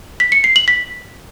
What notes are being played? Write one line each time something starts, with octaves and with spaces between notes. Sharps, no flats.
B6
C#7
C7
F#7
B6